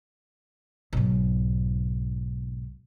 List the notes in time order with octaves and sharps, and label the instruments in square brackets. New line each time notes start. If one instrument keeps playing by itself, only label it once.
[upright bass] B1 G#2